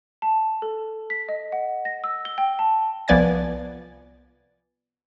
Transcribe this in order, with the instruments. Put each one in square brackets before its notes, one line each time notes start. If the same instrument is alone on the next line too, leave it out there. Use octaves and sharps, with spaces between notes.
[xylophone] A5
A4
B6
D#5
F#5
A#6
E6
G7
G5
A5
[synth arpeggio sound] C2 F3 B3 D5 G#5 A6